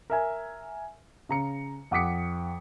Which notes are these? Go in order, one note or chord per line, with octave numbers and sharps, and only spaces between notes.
A#4 E5 G#5
C#3 A#5 C#7
F2 F#5 D6 D#6 B6 C#7